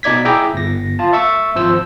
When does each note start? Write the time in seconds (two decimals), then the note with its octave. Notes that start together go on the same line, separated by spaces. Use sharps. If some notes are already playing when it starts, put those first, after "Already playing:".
0.03 B2 D#4 D5 G#6 B6
0.25 E4 G#4 E5 G5 A#5 D6
0.54 G1 A#6
0.99 F4 A5
1.13 E5 C#6 E6
1.55 G#1 F3 C5 E6